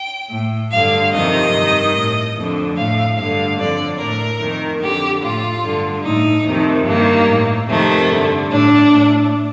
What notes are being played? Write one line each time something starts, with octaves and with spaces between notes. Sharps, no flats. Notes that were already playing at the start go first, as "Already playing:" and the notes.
Already playing: G5
A2
G2 D3 F5
F2 C3 D#3 D#5
G2 D#3
A2
F2 D3
A2 F5
G2 F5
D3
F2 D3 D5
A2 A#4
F2 D#3
F2 D3 G4
A2 F4
G2 D3
A2 D#4
F2 C3 D#3
G2 D#3 A#3
A2
F2 C3 D#3 A3
G2 D3
A2 D4
A2